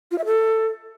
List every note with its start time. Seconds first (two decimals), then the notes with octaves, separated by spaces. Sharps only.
0.11 F4
0.18 E5
0.25 A4